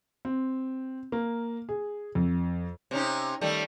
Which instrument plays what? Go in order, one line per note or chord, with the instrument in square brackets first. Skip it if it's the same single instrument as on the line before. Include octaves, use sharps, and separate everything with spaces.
[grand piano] C4
A#3
G#4
F2
[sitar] C3 C#4 D#4
D#3 G3 A3